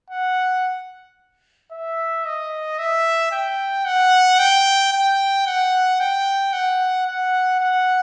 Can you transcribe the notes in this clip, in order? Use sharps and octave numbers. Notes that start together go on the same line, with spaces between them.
F#5
E5
D#5
E5
G5
F#5
G5
G5
F#5
G5
F#5
F#5
F#5